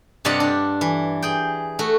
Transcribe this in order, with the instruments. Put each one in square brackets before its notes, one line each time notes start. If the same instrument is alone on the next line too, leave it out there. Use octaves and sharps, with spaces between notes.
[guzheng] G2 C3 D4 D5 D#5 F#5
D4
E3
G#4 G5
A3 F#4